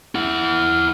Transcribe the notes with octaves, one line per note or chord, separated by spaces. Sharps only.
E4 F#5